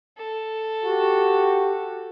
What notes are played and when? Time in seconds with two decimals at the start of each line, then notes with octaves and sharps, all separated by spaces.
0.18 A4
0.84 F#4 G4